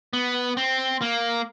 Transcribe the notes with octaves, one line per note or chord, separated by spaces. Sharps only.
B3
C4
A#3